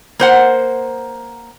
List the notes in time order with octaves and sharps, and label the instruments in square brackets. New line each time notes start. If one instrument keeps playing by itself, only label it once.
[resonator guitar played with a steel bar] A#3 C5 F#5